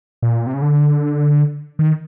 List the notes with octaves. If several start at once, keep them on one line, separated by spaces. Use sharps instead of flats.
A#2
C3
C#3
D3
D#3